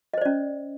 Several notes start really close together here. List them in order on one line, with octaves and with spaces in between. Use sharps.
D#5 C5 D5 C#4